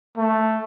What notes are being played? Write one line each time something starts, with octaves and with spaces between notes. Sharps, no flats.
A3